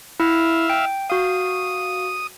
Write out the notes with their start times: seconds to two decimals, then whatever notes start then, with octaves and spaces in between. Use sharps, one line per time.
0.20 E4 E5 F5
0.70 G5
1.10 F#4 F5 D#6